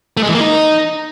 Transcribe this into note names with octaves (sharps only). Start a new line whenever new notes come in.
A3
G#3
E3
A#3
D#4